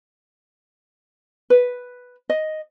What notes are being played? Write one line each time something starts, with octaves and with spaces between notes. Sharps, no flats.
B4
D#5